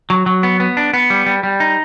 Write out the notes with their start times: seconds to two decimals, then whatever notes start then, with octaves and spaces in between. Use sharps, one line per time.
0.10 F#3
0.26 F#3
0.43 B3
0.60 B3
0.77 D4
0.94 B3
1.10 G3
1.26 G3
1.43 G3
1.60 D#4